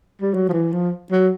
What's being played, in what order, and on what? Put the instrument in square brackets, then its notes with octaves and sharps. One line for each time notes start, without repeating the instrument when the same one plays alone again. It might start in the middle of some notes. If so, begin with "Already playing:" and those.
[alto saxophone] G3
F#3
F3
E3
F3
F#3